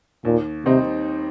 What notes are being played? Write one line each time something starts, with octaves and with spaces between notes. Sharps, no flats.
D#2 A#2
C3 D#3 G3 C4 D#4